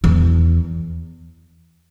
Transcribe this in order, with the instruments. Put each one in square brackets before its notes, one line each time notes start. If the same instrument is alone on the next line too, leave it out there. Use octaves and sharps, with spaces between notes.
[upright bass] E2